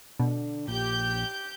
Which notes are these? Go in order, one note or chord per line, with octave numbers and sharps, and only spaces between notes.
B2 D3
A#1 G4 G6